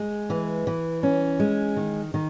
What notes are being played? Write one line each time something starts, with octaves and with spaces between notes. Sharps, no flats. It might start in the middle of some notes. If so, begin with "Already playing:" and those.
Already playing: G#3
E3
E3
C#4
G#3
D#3
D#3